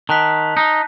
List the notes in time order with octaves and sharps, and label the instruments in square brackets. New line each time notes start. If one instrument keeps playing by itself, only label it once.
[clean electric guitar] D#3 [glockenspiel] A5 F#6 B6
[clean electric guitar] D#4